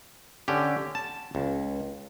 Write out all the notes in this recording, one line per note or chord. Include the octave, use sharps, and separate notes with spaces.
D3 C#4 G4
A5
C#2